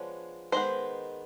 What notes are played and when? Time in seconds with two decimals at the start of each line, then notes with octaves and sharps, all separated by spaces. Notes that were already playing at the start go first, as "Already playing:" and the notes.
Already playing: F3 G#3 B3 D4 C#5
0.52 D#3 G#3 B3 C5